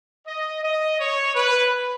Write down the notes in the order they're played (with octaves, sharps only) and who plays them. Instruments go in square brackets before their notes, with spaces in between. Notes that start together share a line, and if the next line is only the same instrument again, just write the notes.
[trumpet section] D#5
D#5
C#5
B4